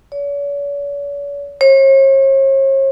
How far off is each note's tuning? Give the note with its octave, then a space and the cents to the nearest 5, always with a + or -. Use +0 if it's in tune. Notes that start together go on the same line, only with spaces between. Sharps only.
C#5 +45
C#5 -40